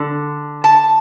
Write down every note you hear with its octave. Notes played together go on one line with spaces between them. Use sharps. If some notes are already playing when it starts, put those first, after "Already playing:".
Already playing: D3
A5